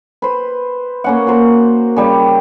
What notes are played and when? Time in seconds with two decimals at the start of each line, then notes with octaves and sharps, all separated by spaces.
0.22 B4 C5
1.04 A#3 C#4 F#5
1.27 F#4 A#4 C5
1.96 C#3 G3 G4